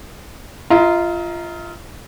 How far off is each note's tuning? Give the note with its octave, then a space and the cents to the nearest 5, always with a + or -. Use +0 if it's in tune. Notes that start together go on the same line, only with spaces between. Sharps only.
F4 -15 D#5 +40 A#5 +0